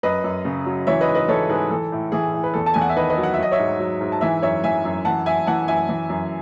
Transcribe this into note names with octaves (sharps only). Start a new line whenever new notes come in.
F#2 B4 D#5
F#2
C#3
F#3
E3 C#5 E5
B4 D#5
G#2
B4 D#5
E3 A4 C#5
G#2 G#4 B4
E3 A4
A2
E3 G#4
A2
B4
E2 A4
A5
E2 G#5
F#5
E5
D#3 B4 D#5
B4 D#5
F#3
F#5
E5
F#3 D#5
C#5 E5
G#2
F#3
G#2
A5
E3 E5 G#5
F#2 C#5 E5
E3 E5 G#5
F#2
E3 F#5 A5
F#2 E5 G#5
E3 F#5 A5
F#2 E5 G#5
E3
F#2